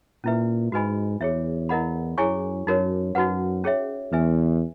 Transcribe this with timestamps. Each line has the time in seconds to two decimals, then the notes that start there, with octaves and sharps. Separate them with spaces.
0.24 A#2 C#4 E4 B4 E5
0.72 G#2 F#4 B4 D#5 G#5 B5
1.21 E2 G#4 C#5 E5
1.69 E4 A#4 D#5 F#5 B5
2.18 F#2 E4 G#4 C#5 G#5 C#6
2.66 F#2 D#4 F#4 A#4 C#5
3.15 F#2 D#4 F#4 B4 F#5
3.64 C#4 G#4 C#5 E5
4.12 E2 B4 E5 G#5